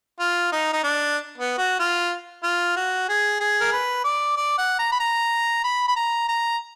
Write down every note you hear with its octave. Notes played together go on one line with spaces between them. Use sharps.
F4
D#4
D#4
D4
B3
F#4
F4
F4
F#4
G#4
G#4
A#4
B4
D5
D5
F#5
A#5
B5
A#5
B5
B5
A#5
A#5